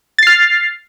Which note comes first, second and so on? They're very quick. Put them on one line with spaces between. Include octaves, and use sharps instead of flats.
A6 C7 F6